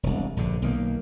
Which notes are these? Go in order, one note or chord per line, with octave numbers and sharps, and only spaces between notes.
E1 C2
A#1 G2 D3
B1 D#3 G3 A#3